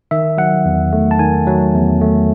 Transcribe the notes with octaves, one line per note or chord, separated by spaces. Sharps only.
D#3 E5
F#3 F#5
E2
A3
A5
D#3 G#5
F#3
E2
A3